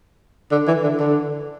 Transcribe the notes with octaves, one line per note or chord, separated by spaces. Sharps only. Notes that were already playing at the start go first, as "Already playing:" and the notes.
D3
E3
D3
D3